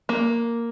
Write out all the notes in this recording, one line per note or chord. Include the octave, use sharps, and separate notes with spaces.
A#3